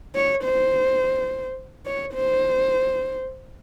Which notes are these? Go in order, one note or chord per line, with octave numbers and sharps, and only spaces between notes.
C#5
C5
C#5
C5